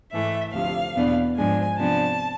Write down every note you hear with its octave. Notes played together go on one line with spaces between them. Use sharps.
G#2 E3 A3 E5
D2 C3 F3 F5
E2 B2 B3 D4
G#2 F3 G#3 D4 G#5
C3 F3 B3 D4 A5